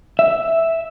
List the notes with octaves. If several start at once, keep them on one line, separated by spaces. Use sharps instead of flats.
E5